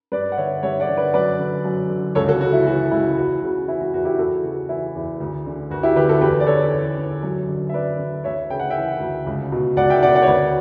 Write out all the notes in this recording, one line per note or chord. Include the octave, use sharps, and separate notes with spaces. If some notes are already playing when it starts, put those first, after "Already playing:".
G2 B4 D5
F#5
D3 C#5 E5
G2 C#5 E5
D5 F#5
D3
B4 D5
F#2 B4 D5
D3
F#2
D3
C#2 A4 C#5
F#4 A4
C#3 F#4
E4
E3 F#4
C#2 E4
E2 F#4
C#3 F#4
E3 E4
F#4
E2 F#4
E4 G4
E2 F#4 A4
C#3 F#4
E3 E4
E2
D2
D3
D2 F#4
E4 G4
D3 G4 B4
F#4 A4
E2 G4 B4
D5
D3 A4 C#5
E2
D3
F#2
D3
E5
F#2 B4 D5
D3
D2 C#5 E5
C#3 G5
F#5
E5 G5
E3
D2
C#2
B2
C#2 D5 F#5
E5 G5
B2 D5 F#5
D5 F#5
C#5
D2 B4 D5